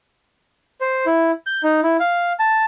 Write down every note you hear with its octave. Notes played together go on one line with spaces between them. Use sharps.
C5
E4
G6
D#4
E4
F5
A5